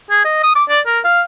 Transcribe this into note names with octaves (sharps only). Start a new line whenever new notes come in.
G#4
D#5
D#6
D6
D5
A#4
F5